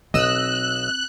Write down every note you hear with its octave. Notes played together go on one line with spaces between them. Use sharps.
B1 C4 D#5 E6 F#6